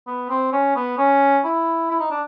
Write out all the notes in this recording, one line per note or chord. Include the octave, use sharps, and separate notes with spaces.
B3
C4
C#4
B3
C#4
E4
E4
D#4
D4